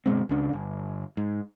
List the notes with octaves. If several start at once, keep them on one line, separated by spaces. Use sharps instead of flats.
G1 B2 G#3 C4
C#2 C#3 D4
G1
G#2